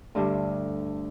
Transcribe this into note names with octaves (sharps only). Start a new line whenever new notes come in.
D2 G2 D3 G3